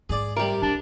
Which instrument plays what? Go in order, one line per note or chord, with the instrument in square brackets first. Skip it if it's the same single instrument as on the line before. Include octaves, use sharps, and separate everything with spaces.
[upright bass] G#2 [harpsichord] G#4 D5
[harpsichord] C3 G3 [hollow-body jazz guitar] G4 A#4
[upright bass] C2 [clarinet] D4